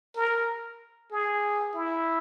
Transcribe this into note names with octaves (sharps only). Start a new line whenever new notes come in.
A#4
G#4
E4